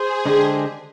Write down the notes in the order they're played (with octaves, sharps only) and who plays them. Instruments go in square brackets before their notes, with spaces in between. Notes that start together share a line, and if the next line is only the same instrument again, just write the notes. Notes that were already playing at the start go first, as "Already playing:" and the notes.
Already playing: [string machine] G#4 [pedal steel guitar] C5
[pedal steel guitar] D3 G#3 D4 G4 C5